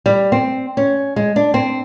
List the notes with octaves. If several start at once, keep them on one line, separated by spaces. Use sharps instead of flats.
G3
C4
C#4
G#3
D4
C4